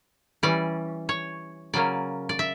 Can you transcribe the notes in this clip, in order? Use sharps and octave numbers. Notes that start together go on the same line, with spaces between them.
E3 G3 C#4 D5
C#5
C#3 F#3 A#3 C#4 D5
D5
E5